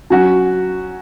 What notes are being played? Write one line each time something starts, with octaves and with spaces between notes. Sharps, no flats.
F#3 C#4 F#4